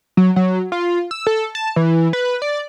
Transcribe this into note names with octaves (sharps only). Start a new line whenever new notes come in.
F#3
F#3
F4
E6
A4
A5
E3
B4
D5